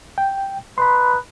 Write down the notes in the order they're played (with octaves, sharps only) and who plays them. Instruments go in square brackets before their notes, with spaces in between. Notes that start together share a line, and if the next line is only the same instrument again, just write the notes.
[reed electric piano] G5
[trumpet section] D#4 B4 [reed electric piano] B5 C6